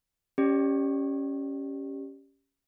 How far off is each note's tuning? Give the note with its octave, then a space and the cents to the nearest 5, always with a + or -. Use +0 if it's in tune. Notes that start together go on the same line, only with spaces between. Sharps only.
C#4 +0 G4 +0 D5 +30